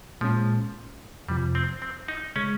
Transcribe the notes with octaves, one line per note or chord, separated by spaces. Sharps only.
A#2 F3 G#3 C#4
F2 C3 F3 G3
C4
C4
D#4
C#3 G#3 C#4